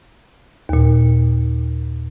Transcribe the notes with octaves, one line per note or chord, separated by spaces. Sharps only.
D#2 A#2